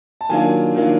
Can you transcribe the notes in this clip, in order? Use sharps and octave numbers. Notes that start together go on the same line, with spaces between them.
A5
D#3 F#3 A#3 D4 F4 G#5
D#3 F#3 A#3 D4 F4